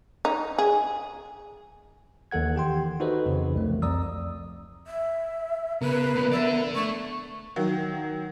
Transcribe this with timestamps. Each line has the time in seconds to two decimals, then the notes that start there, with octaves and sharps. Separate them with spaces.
0.25 D#4
0.58 G#4
2.31 D#2 E3 A4 F#5 G#6
2.55 D#3 G4 G5 C6
3.00 D#4 F#4 A4 B4 C5 D#5
3.26 F2 C#3 E3
3.55 C2 F3 A3
3.82 F2 D5 A#5 D#6 E6
4.87 E5
5.81 C#3 B3 A#4 B4
6.16 F3 A#3
6.32 A4 D5 E5
6.75 A3 C#6
7.56 D#3 F#3